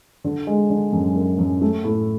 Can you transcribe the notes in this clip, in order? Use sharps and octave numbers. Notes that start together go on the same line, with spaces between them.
D3
G#3
D3
F#2
F#2
F#2
A3
A2